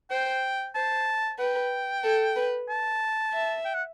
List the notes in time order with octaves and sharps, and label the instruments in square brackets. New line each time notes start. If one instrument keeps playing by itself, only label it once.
[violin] C5 [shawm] G5
[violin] C5 [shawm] A5
[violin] B4 [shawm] G5
[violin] A4
B4
[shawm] A5
[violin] E5
[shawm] G5
F#5